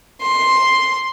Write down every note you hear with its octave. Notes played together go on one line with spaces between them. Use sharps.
C6